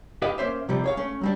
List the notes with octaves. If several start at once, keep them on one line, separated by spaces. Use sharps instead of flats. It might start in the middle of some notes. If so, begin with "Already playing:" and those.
G4 B4 D#5 F5
A#3 C#4 C5 E5
C3 F3 G3
G#4 C#5 F5
A3 C#4
F#3 G3 D4